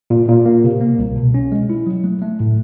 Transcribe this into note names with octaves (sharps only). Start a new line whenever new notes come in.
A#2
A#2
A#3
C3
A#3
C2
B2
C#4
G#3
E4
F#3
A3
A3
A2